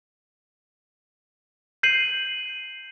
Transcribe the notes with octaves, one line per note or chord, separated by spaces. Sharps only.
G6 C7 D#7 F#7